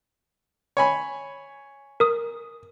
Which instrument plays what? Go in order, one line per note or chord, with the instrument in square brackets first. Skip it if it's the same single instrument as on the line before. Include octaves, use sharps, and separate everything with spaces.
[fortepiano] C#5 G#5 B5
[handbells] A#4 D#6